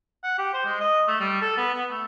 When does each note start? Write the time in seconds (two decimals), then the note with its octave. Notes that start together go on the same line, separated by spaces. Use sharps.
0.23 F#5
0.38 G4
0.54 C5
0.66 G#3
0.80 D#5
1.08 A3
1.20 G3
1.42 A4
1.57 B3
1.74 B3
1.90 A3